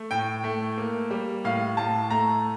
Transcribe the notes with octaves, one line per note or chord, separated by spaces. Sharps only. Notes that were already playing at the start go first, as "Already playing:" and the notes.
Already playing: A3
A2 G5
A3
A#3
G3
A2 F5
A2 A5
A3 A#5